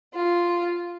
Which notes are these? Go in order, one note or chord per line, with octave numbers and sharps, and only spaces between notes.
F4